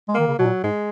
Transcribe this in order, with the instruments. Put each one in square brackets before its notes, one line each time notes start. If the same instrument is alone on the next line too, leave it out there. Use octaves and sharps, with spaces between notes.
[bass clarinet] G#3
[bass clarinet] D#3 [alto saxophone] A#3
[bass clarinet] C#3
[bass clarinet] B2 [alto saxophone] F#3
[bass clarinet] A#2
[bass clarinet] G#2 [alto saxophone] G#3